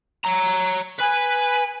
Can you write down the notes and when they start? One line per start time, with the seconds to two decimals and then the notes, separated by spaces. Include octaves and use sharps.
0.24 C#5 A#5
1.00 B4 G#5